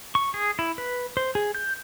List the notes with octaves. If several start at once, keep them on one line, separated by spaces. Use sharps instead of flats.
C#6
G#4
E4
B4
C5
G#4
G6